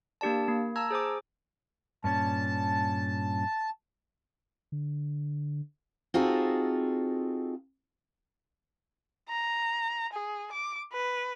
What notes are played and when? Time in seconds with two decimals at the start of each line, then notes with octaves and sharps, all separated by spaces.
0.21 A#3 D4 G4 D5 A5
0.48 A#3
0.76 A5 A#5 E6 G#6
0.91 G#4 C5 G#5 D6
2.04 G2 A#2 C#4 A5
4.72 D3
6.14 C4 D#4 F4 F#4 G#4 A4
9.29 A#5
10.13 G#4
10.52 D6
10.93 B4